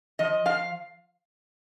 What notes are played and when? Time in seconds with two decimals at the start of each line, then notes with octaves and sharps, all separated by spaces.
0.19 F3 D#5
0.45 F3 F5